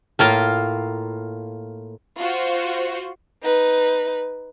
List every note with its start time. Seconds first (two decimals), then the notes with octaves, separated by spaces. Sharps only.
0.19 A2 A#3 F4
2.19 F4 F#4 C5
3.43 D#4 B4